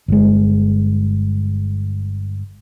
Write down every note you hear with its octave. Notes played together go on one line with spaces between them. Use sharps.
G1 G#3